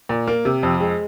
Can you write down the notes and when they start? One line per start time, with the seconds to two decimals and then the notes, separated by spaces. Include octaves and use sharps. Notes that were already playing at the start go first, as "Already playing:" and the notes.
0.09 A#2
0.27 A#3
0.45 C3
0.63 F2
0.80 G#3